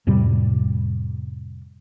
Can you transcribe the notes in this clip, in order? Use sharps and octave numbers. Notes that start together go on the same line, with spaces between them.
F2 A2 C3 G3